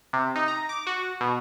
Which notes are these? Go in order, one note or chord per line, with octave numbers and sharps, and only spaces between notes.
C3
D#4
A#5
D6
F#4
B2